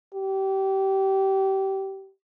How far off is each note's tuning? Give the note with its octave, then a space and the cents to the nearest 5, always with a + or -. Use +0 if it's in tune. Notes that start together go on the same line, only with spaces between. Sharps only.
G4 -25